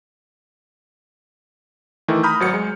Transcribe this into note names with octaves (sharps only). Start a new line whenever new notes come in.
D#3 E3 A3 E4
A#5 B5 D#6 F6 G6
G#1 F#3 C#7
G#3